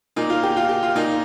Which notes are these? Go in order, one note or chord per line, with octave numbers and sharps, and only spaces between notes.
A#2 D#4
F4
G4
F4
G4
F4
A#2 D#4